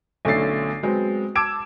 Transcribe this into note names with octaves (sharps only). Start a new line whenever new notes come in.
B1 D3 A3 C#4 A6 C7
F#3 G#3 B3 C4
A5 D6 E6 G#6 D7 E7